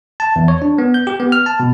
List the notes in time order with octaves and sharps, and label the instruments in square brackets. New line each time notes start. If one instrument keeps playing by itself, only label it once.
[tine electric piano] A5
E2
C#5
D4
B3
G6
G4
B3
F6
A5
B2